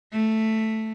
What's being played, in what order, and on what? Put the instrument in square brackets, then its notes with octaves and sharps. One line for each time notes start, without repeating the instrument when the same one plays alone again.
[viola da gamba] A3